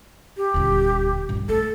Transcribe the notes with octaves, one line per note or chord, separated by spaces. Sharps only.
G4
D#1 D2
G2 D3
A3 A4